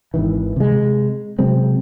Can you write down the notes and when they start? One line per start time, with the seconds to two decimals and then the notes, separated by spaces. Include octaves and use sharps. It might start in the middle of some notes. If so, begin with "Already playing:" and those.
0.14 G#1 D#3 E3
0.56 C3 G#3
1.39 C3 F#3 G#3 C4